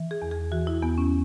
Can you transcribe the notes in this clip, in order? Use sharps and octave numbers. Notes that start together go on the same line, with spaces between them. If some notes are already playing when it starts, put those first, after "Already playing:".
Already playing: E3
G#4
E2
G#4
E3 F#4
E4
E2 B3
C#4